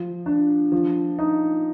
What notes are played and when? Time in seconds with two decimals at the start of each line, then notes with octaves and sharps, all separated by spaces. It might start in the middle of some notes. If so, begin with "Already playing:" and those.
Already playing: F3
0.26 D4
0.72 F3
1.19 D#4